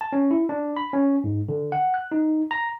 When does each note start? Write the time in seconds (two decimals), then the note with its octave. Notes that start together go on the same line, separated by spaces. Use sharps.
0.01 A5
0.13 C#4
0.31 E4
0.49 D4
0.77 B5
0.93 C#4
1.24 G#2
1.49 D3
1.72 F#5
1.94 F#6
2.12 D#4
2.51 A#5